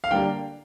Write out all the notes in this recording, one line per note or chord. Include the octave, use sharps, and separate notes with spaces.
F5
D3 G3 A#3 D4 G5